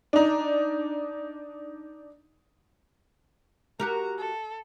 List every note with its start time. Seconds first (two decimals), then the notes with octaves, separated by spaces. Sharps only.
0.13 D4 D#4
3.80 F#4 G4 A#4 A#5
4.18 A4